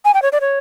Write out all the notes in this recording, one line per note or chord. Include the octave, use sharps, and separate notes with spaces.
G#5
G5
C#5
D5
C#5